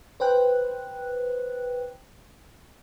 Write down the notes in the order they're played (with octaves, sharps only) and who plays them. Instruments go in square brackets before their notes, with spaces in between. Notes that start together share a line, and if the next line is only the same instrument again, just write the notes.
[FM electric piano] B4 C5 G5 F#6